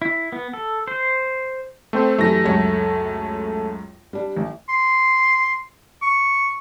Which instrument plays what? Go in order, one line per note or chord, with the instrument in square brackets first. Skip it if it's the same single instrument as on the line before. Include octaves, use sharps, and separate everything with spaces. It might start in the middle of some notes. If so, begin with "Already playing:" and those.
[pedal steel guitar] E4
B3
A4
C5
[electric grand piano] A3 C4 C5
[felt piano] F#2 E3 G3 [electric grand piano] A3 A#6
[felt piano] C#2 F#2 C#5
G3 D4
A1
[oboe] C6
C#6